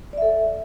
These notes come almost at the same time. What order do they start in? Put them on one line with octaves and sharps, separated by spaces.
D5 E5 A4